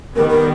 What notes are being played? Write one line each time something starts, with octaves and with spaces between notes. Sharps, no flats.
D#3 G3 B3 A#4
A#4